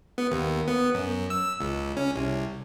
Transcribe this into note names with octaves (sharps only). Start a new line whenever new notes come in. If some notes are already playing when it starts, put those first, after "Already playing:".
B3
D#2
B3
F#2
E6
C#2
C#4
C2